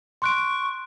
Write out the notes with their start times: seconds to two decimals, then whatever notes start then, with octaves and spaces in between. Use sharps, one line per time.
0.22 C6 C#6 F#6 D7